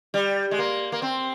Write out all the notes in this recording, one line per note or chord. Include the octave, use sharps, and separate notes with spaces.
G3
G#3
A#3
A#3
C4